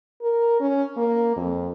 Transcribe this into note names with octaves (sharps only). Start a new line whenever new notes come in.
A#4
C#4
A#3
F2